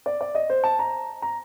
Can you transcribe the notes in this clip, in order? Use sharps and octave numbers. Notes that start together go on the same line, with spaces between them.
D5
D5
D#5
C5
A5
A#5
A#5